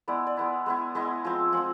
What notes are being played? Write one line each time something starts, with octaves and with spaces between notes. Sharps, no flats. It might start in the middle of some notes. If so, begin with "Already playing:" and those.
G#3 B3 E4 D5
D5
G#3 B3 E4
G#3 B3 E4
G#3 B3 E4 D#5
F3 G#3 C4
F3 G#3 C4 F#5